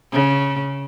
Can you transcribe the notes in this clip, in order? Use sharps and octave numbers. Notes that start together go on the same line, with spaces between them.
C#3